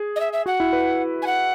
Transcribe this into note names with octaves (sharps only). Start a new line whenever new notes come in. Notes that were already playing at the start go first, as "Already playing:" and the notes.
Already playing: G#4
D#5
E5
E5
F#4 F#5
E4
B4
G#5
F#5